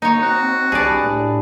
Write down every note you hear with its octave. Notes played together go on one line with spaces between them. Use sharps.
A#3 D#4 C#5
C4 F#4
C2 D4 G4 G#4 B4 D5
A2